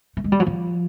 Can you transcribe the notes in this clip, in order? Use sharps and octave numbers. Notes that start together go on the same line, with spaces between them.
A3
G#3
G3
F#3
F3